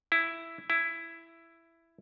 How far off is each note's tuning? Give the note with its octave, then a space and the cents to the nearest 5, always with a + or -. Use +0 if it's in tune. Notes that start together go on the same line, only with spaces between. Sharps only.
E4 +5
E4 +10